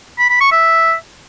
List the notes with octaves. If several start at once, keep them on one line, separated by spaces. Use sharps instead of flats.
B5
B5
C#6
E5